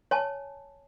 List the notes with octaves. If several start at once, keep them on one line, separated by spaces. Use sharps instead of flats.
C#5 G#5 A5